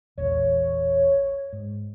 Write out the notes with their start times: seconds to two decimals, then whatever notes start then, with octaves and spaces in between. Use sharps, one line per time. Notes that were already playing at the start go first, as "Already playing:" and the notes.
0.18 E1 A#1 E2 C#5
1.53 G#2